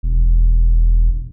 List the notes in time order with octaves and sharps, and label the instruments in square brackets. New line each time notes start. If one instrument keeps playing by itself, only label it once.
[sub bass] E1